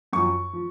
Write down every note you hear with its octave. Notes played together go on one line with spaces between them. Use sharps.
F#2 F3 C#6
F3